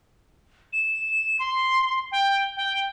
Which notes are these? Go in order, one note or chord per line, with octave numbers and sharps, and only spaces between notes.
E7
C6
G5
G5